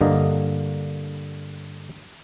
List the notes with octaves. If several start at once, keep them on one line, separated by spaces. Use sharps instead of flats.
G2 D3 A#3 D#5